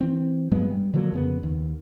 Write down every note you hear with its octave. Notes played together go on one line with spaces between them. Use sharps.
E3 C4
G2 F#3 G#3 B3
G3
D3 F3 F#3 A#3
F2 C#3 B3
D#2